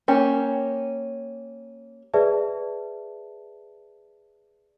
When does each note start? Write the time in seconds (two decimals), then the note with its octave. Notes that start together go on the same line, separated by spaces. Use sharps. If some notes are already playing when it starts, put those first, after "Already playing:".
0.08 A#3 C#4 G4
2.14 G#4 B4 D5 E5 A5